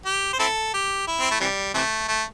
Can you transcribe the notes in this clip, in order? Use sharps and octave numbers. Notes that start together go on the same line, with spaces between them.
G4
C5
C4 E4 A4
G4
E4
C4
A3
C3 E3 G3
C3 E3 A3
A3